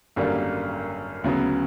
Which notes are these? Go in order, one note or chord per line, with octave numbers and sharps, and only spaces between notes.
G#1 F#2 D3 G3 A#3
D2 C#3 F#3 B3